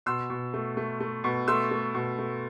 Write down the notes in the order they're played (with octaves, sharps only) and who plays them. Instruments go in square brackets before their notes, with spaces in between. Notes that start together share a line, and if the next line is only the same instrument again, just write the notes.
[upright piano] B2 C6 E6
B2
A3
A3
A3
B2
A3 C6 E6
A3
B2
A3